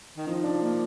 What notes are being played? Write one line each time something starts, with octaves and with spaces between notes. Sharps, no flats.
D#3
F3 D#4
D4
A#3